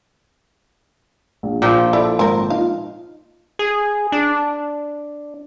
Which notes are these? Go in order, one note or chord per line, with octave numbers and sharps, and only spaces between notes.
A#1
A#2 F3 G5
E4 A4 D5 B5
G#1 C4 A#4
D#4 F4 F5
G#4
D4